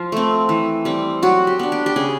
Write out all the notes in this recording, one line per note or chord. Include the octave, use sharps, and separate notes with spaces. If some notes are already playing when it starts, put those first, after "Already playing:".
Already playing: F3 F4
A3 C4
E3
G3 C4
F#3 F#4
G4
B3 D4
G4
G4
C#3 G#4